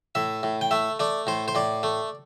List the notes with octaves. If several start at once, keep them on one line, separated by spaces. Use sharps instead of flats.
A2 E5
A2
G5
A3 E5
A3 D5
A2 C5
C5
A2 D5
A3